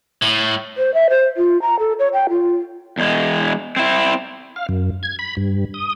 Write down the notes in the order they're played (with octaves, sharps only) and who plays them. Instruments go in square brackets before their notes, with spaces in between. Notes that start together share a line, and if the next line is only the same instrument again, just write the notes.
[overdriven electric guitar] A2
[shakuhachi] C5
E5
C5
F4
A#5
A4
C#5
G5
F4
[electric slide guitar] E2 G#3
C4 E4
[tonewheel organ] F5
F#2
G#6
B5
G2
D#6